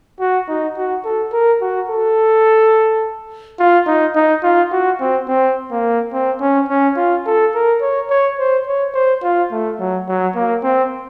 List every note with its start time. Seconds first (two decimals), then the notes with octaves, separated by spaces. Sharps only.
0.20 F#4
0.48 D#4
0.77 F#4
1.05 A4
1.33 A#4
1.61 F#4
1.90 A4
3.60 F4
3.87 D#4
4.15 D#4
4.43 F4
4.72 F#4
5.01 C4
5.28 C4
5.71 A#3
6.13 C4
6.41 C#4
6.69 C#4
6.97 F4
7.26 A4
7.54 A#4
7.81 C#5
8.10 C#5
8.39 C5
8.67 C#5
8.94 C5
9.23 F4
9.52 A3
9.80 F#3
10.08 F#3
10.35 A#3
10.64 C4